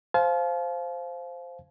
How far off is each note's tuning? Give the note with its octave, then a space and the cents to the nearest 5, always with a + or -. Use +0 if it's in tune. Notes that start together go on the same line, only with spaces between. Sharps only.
C5 +0 F5 +0 A5 -45